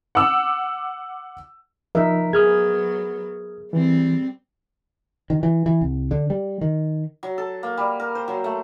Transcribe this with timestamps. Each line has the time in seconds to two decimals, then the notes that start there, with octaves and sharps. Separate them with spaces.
0.15 F#5 D6 E6
1.95 F3 D#4 A#4 E5
2.33 F#3 B3 G#4 D#6 F6 G#6
3.73 E3 G3 C4
5.30 D#3
5.43 E3
5.66 E3
5.81 C2
6.11 D3
6.30 G3
6.61 D#3
7.23 F#3
7.38 A4
7.63 A#3
7.77 G3
8.00 A#4
8.15 C5
8.28 F#3
8.44 A3